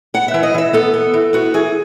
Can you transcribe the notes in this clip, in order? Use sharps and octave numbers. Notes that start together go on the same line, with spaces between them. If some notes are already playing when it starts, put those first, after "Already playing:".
B3 F#5
E5
E3
D#5
E3 E5
B3 A4
B3
E3
B3 F#4
E3 G#4